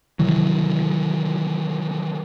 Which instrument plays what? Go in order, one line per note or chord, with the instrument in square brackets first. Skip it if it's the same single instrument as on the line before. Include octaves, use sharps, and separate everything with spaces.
[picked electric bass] C3 D#3 E3 F#3